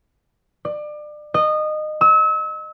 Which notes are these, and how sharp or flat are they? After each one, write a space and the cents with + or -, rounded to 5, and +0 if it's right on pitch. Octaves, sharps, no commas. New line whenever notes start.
D5 +30
D#5 -20
E6 -35